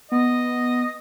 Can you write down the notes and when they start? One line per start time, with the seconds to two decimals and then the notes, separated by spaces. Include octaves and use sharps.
0.12 B3 D#5